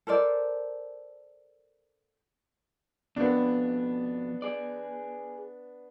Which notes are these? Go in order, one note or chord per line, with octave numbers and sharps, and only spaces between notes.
A4 A#4 C5 D5
F2 B2 B3 D4
G#4 D5